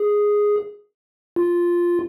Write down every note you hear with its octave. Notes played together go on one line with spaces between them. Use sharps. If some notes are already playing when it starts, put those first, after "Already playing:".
Already playing: G#4
F4